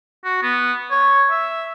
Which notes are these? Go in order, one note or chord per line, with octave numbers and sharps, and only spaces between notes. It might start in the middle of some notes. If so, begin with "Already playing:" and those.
F#4
B3
C#5
E5